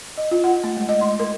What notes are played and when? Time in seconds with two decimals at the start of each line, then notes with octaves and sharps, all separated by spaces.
0.18 D#5
0.31 F4
0.44 F#5
0.64 A3
0.77 G#3
0.89 D#5
1.01 C6
1.20 A#4